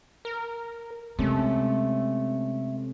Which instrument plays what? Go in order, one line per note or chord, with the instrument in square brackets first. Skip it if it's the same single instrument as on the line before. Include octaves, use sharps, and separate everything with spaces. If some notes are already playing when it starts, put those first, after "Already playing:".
[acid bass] A#4
[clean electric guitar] C3 C#4 [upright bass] G#3 [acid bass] A3